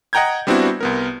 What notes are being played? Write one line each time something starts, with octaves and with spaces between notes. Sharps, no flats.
D#5 F#5 G5 A#5 G6 G#6
G3 B3 C4 D4 E4 F#4
C2 B3 A#4